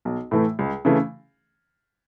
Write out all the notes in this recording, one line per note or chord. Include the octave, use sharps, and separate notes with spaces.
B1
A2 E3 A3
C#2
C#3 E3 A3